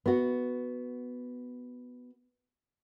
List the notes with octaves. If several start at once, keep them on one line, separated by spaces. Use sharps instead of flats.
B3 F#4